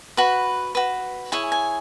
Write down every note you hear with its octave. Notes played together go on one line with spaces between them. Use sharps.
F#4 B4 B5
F#4 B4
E4 G#4 C#5 G#5
G#5